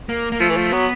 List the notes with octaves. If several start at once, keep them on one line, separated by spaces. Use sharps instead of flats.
A#3
A#3
F3 A3
E3
F3
F#3 B3